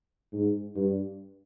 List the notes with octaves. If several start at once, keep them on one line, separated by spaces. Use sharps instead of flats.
G#2
G2